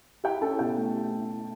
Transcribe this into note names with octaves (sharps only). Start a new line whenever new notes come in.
E4 G4 G5
C#4 A4 A5
B2 G4 G5
A3
E4